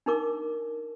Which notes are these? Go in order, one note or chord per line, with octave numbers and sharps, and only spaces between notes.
D4 D#4 A#4 D6